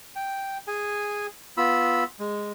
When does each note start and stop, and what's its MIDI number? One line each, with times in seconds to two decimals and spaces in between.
0.16 0.58 79
0.67 1.27 68
0.67 1.27 80
1.57 2.04 59
1.57 2.04 65
1.57 2.04 83
1.57 2.04 88
2.19 2.52 56